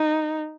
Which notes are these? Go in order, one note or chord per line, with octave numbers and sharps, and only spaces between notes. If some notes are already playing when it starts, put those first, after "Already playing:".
Already playing: D#4